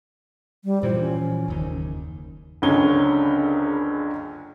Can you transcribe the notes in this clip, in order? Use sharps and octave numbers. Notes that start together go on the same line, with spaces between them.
G3
A#2 E3 F3 C5
C#4
F#1 D#2 D#3
F#1 C#2 D3 C#4 G7